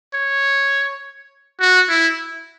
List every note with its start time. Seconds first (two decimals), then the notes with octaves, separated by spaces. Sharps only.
0.14 C#5
1.60 F#4
1.89 E4